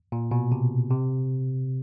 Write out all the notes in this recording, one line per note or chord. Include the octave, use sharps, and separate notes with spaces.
A#2
B2
C3
C3